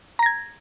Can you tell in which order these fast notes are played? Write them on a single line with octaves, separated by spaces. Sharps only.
A#5 A#6 G#6